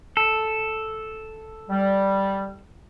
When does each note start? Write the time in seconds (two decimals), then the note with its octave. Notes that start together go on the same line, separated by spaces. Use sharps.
0.17 A4
1.69 G3